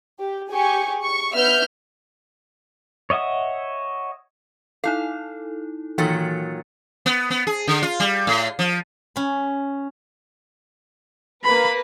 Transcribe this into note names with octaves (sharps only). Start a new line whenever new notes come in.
G4
G4 G#4 G#5 C#6
C#6
B3 E5 F6 G6
C#5 D#5 E5 F#5 D#6
D#4 E4 A4 F5
A#2 D#3 E3 F#3 A6 C#7
B3
B3
G#4
D3
F4
G3
A2
F3
C#4 B5
A#3 B4 B5